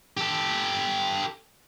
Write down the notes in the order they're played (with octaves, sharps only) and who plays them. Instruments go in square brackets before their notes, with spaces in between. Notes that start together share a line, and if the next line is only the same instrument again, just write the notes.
[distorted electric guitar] G4 A4